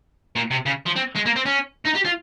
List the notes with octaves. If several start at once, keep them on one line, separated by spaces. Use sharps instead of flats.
A#2
C3
C#3
F3
C4
G#3
A#3
C4
C#4
D#4
G4
F4